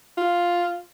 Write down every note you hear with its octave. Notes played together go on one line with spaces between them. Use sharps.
F4